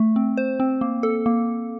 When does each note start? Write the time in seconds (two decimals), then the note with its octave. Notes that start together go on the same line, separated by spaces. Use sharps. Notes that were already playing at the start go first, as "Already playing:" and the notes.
Already playing: A3
0.16 C4
0.37 C5
0.60 C4
0.81 A#3
1.03 A4
1.26 A#3